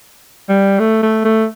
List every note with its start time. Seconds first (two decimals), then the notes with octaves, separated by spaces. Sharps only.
0.49 G3
0.79 A3
1.03 A3
1.25 A3